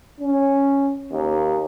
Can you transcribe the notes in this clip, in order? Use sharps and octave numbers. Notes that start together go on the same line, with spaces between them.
C#4
D#2